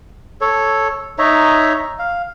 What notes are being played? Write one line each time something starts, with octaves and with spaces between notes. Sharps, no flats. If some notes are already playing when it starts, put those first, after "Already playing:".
A4 C#5
D#4 C#5 E5 A#5
F5